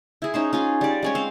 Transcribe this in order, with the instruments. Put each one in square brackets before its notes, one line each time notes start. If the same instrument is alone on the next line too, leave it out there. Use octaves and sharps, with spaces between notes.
[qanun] E4 G#4
C#4 D#4 C5
C#4 F4 G#4
G3 D5
G#3 C#4 C#5
C4 F5